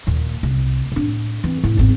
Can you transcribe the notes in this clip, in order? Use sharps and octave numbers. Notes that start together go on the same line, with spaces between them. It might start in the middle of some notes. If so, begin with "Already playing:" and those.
D#2 A#2
C2
A2 D4
E3 C4
A2 E4
G#1 E2